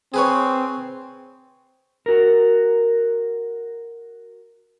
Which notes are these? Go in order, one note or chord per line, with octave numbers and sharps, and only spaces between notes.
C4 G#4 B4 C#5
F#4 A#4